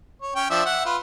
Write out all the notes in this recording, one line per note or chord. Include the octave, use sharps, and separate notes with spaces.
C#5
C#4 C#5 G5
F3 D4 E5
E5 F#5
F4 B4